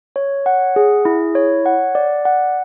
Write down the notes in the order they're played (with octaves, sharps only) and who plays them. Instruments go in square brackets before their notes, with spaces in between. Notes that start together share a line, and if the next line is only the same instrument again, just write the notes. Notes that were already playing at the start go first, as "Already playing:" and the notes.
[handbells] C#5
F#5
G#4
E4
C#5
F#5
D5
F#5